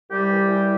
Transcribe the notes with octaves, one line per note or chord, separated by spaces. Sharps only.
C2 G3 G4
E3
E3